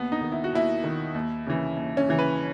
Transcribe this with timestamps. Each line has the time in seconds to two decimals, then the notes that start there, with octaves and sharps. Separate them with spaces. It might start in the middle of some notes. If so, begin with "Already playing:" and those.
Already playing: D#2 B3
0.12 D#4
0.21 D#3
0.32 E4
0.44 F#4
0.53 D#2 E4
0.84 D#3
1.14 D#2
1.47 C#3 E3
1.77 D#2
1.97 C#4
2.09 C#3 E3
2.19 B4